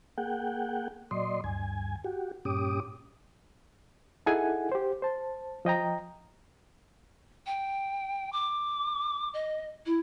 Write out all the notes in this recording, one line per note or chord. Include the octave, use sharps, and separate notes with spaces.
A#3 G#4 F#5 G5
A#2 F#3 D5 D#5 C6
D2 G2 G#5
F#4 G4
G2 A#2 C#4 G4 D6 D#6
D#4 E4 G#4 A4 F#5 G#5
G4 C5
C5 A5
F3 D#5 G5 A#5
G5
D6
D#5
E4